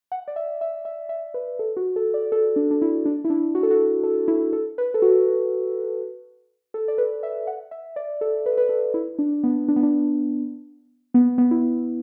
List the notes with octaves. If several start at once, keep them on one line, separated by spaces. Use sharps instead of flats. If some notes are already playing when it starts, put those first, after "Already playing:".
F#5
D5
E5
E5
E5
E5
B4
A4
F#4
A4
D5
A4
D4
D4
E4
D4
E4
D4
F#4
A4
F#4
A4
E4
A4
B4
A4
F#4
A4
D5
B4
E5
F#5
E5
D5
A4
B4
B4
A4
E4
D4
B3
D4
B3
D4
B3
B3
E4